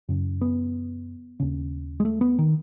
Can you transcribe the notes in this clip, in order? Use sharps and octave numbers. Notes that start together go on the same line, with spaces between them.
F#2 C#3
B3
D#2 C#3
G#3
A3
B3
D#3